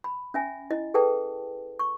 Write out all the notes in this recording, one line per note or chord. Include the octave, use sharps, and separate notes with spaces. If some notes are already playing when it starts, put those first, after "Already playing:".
B5
C#4 E5 G#5
E4 D#5
G#4 A4 B4 G5 A5
C#6